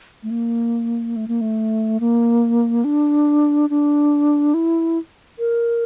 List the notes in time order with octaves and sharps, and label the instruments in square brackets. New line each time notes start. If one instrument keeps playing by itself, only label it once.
[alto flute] A3
A#3
A3
A#3
A3
A#3
D4
D4
E4
A#4